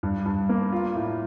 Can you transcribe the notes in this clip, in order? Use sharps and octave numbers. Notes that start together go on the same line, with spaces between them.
G2
G2
A#3
F4
A2